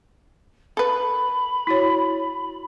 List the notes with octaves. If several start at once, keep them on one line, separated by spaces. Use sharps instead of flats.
A4 B4 B5
E4 F#4 C#5